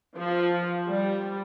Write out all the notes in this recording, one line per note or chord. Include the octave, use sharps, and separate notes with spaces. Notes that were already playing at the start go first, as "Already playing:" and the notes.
F3
G3